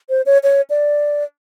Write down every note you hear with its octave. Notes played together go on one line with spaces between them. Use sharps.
C5
C#5
C#5
D5